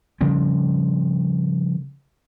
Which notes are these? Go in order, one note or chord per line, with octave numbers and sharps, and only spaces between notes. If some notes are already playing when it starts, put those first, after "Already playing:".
C#3 F3 G3 C4